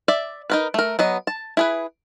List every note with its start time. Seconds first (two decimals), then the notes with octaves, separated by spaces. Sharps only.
0.08 D5 E5
0.50 D#4 A#4 B4
0.74 A3 A#4
0.99 F#3 B3 D#5
1.27 A5
1.57 E4 G#4 B4